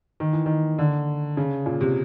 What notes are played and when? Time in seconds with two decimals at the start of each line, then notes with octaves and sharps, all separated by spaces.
0.20 D#3
0.33 E3
0.46 D#3
0.79 D3
1.37 C#3
1.66 A#2
1.81 C3